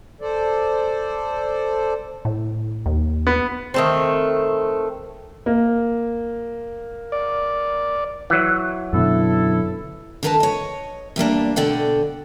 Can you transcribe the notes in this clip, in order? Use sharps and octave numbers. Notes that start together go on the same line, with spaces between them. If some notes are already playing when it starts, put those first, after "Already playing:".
A4 C5 D5
A2
D#2
B3
D#3 A3 C4
A#3
D5
E3 F#3
F#2 B2 D3 E4 A4
D3 D#3 A#4 B4 F#5 A5
C#5 D#5
E2 G3 A#3 D4
B2 D3 D5 F#5 G5